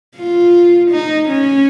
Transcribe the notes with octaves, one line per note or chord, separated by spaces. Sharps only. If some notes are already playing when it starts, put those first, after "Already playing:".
F4
D#4
C#4